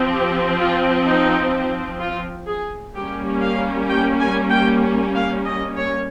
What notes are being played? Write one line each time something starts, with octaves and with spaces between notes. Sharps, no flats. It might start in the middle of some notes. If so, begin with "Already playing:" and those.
Already playing: F3 C4
G4
F4
D#4
F4
G#4
G3 A#3 C#4 G4
F5
G5
G#5
G5
F5
D#5
C#5